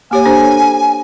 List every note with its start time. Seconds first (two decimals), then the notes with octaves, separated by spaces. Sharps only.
0.11 A#3 G4 C#5 G#5
0.26 D4 A4 C5